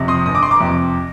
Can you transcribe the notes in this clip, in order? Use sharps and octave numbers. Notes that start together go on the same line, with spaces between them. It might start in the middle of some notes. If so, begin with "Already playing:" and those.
Already playing: F2 C3
C6 D#6
G1 D#6
D6
C6
A#5 D6
F2 C3